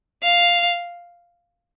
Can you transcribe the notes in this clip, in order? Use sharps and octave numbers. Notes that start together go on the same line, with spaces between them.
F5